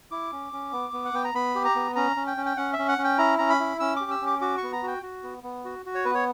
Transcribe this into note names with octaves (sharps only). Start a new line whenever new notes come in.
E4 D6
C#4
C#4
B3
B3
F#5
B3 G5
A#5
B3 B5
G4
A#5
B3
C#4 A#5
C#4
G5
C#4
G5
C#4 F#5
E5
C#4
F#5
C#4
G5
E4 A#5
C#4 A#5
B5
E4
C#4 E6
G4 D6
E6
C#4
D6
F#4 D6
C#6
B3
A#5
F#4 G5
F#4
B3
B3
F#4
F#4
C#5
B3 B4
C#5